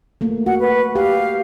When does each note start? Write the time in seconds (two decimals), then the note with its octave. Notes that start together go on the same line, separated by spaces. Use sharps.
0.21 A3 A#3
0.46 F#4 F#5
0.60 B4
0.96 G4 F5